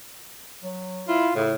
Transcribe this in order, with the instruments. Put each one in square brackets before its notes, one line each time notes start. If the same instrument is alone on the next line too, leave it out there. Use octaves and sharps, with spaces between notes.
[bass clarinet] F#3
[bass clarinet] E4 [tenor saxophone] F4
[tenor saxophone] A2 [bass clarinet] C#3